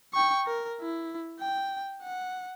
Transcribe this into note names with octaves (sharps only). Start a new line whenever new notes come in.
G5 C#6
A#4
E4
G5
F#5